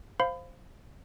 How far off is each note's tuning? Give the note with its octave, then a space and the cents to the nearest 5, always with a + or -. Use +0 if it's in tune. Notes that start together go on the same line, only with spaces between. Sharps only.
C5 +0 F5 +0 B5 +30